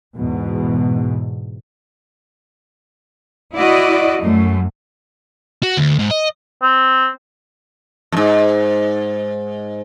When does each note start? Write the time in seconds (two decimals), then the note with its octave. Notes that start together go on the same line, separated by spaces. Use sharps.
0.15 E2 G#2 B2
3.55 E4 F#4 D5 D#5
4.20 F#2 A3
5.63 F#4
5.77 D2
5.99 G#2
6.11 D#5
6.62 C4
8.12 F2 G#2